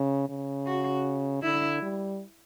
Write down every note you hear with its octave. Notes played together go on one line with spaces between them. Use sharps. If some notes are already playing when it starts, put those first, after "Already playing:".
Already playing: C#3
C#3
F#4
D3 E4
G3